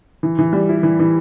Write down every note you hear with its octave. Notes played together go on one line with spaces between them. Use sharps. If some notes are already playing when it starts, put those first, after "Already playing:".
E3
E3
G3
E4
E3
E3